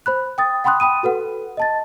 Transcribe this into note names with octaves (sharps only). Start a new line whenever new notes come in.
C5 B5 F#6
G5 D#6 A6
F#5 G5 B5 C6 D#6 F#6
G5 B5 D#6 D#7
F#4 A4 B4 F#5
D#5 A5 A6